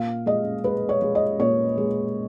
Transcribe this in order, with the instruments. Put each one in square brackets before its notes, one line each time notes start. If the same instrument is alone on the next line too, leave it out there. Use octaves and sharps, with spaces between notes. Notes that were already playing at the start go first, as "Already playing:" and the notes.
Already playing: [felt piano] A#2 F5
G#3 D#5
G#3 B4
C#5
G#3
D#5
A#2 C#5
G#3